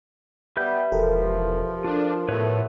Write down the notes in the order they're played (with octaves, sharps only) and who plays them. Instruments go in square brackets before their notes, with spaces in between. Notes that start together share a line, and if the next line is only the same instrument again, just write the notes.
[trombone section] G3 B3 [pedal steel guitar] B4 E5 G6
[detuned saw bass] E1 [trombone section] F3 [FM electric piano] G4 A4 A#4
[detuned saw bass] D4 [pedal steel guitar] F4
[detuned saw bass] A2 [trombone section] F3 A3 B3 [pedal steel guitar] B4 C#5